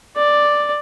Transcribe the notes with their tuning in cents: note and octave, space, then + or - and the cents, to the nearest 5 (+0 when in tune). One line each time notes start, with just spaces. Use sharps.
D5 +5